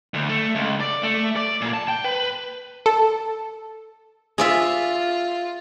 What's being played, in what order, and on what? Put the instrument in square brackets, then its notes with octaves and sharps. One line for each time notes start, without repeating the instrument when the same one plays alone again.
[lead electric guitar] D2
A3
C#2
D5
A3
D5
A#2
A5
G5
B4
[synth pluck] A4
[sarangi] F4 [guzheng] G#4 D5 E5